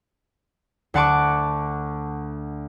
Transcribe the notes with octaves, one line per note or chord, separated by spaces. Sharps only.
D2 D4 F#5 A5 C#6 D6